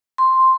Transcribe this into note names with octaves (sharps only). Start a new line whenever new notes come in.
C6